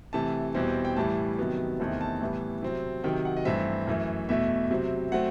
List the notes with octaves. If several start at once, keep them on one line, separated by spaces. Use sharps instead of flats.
C3 E3 A3 A5
E2 B2 G3 C4
G5
A2 E3 G3 A5
C3 D#3 F#3 B3
E2 C3 D#3 A3 C4 A5
A5
A2 E3 G3 B3
C3 F#3 C4
C3 D#3 F#3 G5
F#5
D#5
G2 E3 A3 C4 E5
F#2 E3 A3
E2 B2 A3 E5
C3 F#3 C4
F#3 A3 C4 F#5